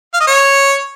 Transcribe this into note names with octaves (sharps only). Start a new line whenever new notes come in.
F5
D#5
C#5